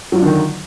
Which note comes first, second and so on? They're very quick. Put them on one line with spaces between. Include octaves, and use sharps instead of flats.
F#3 F4 D4 D3 D#3